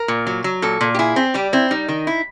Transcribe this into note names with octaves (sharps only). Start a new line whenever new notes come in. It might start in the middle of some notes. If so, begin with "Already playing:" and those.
Already playing: A#4
A#2
F#3
F#3
A#2 A4
A#2
G4
E4 G#4
C4
G3 G4
C4 E4
G3 D#4
D#3
E4